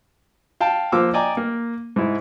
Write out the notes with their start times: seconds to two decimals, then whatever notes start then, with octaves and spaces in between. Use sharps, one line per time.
0.61 F5 G5 A5
0.92 F3 A#3 F4 D6 E6
1.14 D5 D#5 G5 G#5 A#5 D6
1.37 A#3
1.96 G#2 E4